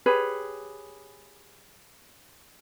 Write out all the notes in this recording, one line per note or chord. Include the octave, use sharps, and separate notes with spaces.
G4 G#4 B4 C#5